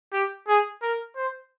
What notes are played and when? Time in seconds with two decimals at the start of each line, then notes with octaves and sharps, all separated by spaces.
0.13 G4
0.48 G#4
0.82 A#4
1.16 C5